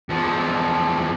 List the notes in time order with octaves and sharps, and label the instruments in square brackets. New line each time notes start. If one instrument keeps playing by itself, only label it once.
[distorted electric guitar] E2 F3